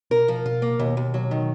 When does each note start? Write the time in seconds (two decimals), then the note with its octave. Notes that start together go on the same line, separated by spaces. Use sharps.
0.10 B2 A#4
0.28 F3
0.46 B2 F4
0.62 A#3
0.79 D#2 B2
0.97 D#2
1.14 F#3
1.31 D#3